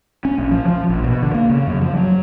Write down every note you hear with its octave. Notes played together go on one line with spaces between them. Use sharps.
C#4
A#1
F3
F3
A#1
B2
D3
A#3
C#3
F#2
F3
F#3